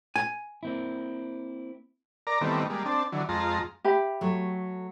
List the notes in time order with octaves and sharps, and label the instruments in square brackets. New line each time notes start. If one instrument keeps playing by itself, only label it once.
[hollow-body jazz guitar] G#5
[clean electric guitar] A#3 C4 E4
[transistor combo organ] A#4 D5 A#5
D#3 E3 G3 A3 B3 C4
G3 G#3 A#3
C4 D4 A5
D3 E3 F#3
F2 G#3 F4 A5 A#5 C6
[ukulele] G4 E5 B5
[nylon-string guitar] F#3 A3